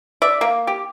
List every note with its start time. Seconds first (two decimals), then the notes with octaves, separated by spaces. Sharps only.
0.22 D5 E5
0.41 A#3
0.67 G4